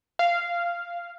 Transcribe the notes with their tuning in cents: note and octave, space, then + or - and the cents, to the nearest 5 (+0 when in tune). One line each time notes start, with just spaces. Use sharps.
F5 -10